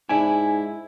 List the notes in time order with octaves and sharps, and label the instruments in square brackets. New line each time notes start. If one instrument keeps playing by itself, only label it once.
[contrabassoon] G#2 [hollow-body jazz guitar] D4 E4 [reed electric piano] G#5